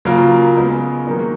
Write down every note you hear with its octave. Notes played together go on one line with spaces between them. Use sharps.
C#3 F#3 A#3 F4 A#4
C#3 G#3 B3
D#3 F#3 A#3 D#4